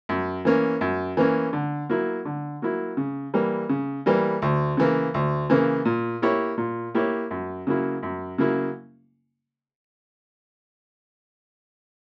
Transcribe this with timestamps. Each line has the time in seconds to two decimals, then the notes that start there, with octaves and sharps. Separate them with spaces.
0.09 F#2
0.45 E3 A#3 C#4
0.81 F#2
1.17 E3 A#3 C#4
1.53 D3
1.89 F#3 A#3 E4
2.25 D3
2.62 F#3 A#3 E4
2.97 C#3
3.34 E3 G3 A#3
3.69 C#3
4.06 E3 G3 A#3
4.42 D2
4.77 C#3 E3 A#3
5.14 D2
5.50 C#3 E3 A#3
5.85 A#2
6.22 A#3 E4 G4 C#5
6.58 A#2
6.95 A#3 E4 G4 C#5
7.31 F#2
7.67 C#3 F#3 A#3 E4
8.03 F#2
8.38 C#3 F#3 A#3 E4